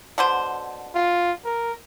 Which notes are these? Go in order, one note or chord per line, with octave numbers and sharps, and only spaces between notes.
B2 D3 C5
F4
A#4